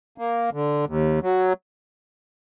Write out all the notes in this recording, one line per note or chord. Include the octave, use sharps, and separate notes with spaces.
A#3
D3
D#2
F#3